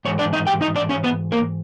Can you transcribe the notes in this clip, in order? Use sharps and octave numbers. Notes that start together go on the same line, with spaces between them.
G#2 E3 C#5
D4 D5
D#4 D#5
G4 G5
D#4 D#5
D4 D5
C#4 C#5
B3 B4
A#3 A#4